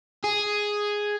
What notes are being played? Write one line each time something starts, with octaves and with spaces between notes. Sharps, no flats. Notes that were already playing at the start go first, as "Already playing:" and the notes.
G#4